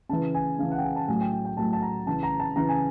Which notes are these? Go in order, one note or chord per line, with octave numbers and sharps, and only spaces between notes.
C#3 E3 A5
G#5
C#3 E3 F5
F#5
G5
G#5
A5
A2 F#3 G#5
G5
G5
G5
A2 F#3 A5
A5
A#5
C#3 E3 A5
A#5
A5
C#3 E3 A#5
G#5